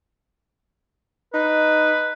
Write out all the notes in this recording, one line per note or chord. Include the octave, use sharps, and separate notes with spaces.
D#4 B4